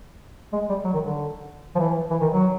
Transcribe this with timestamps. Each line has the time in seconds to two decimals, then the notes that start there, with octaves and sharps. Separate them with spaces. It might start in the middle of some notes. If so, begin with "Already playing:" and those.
0.53 G#3
0.69 G3
0.85 F#3
0.93 D#3
1.01 D3
1.75 F3
1.79 E3
2.11 E3
2.21 D#3
2.32 F#3